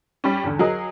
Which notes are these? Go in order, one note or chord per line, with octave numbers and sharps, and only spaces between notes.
G3 C#4
E2 D3
F#3 G#4 A#4 D#5